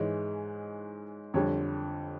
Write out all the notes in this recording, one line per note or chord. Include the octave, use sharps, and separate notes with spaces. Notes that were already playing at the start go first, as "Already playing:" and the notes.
Already playing: G#2 E3 G#3 C#5
F2 D3 G3 C#5